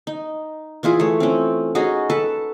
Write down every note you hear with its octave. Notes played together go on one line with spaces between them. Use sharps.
D#4
E3 E4 F4 G#4
A3 C#5
C4 C#4
C#4 D#4 F#4 G#4
A4 B4 A5